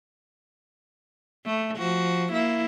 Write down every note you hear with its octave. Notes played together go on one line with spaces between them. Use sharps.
A3
F3 F#4
A#3 E4